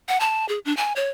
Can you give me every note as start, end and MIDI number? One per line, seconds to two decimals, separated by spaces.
0.08 0.18 78
0.20 0.47 81
0.49 0.59 68
0.65 0.75 62
0.77 0.93 80
0.96 1.10 73